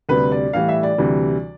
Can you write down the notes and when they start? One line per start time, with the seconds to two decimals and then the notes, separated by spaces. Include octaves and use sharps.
0.09 D2 C3 G3 B4
0.32 D5
0.53 A2 E3 G3 F5
0.69 E5
0.83 D5
0.98 D2 C3 E3 G3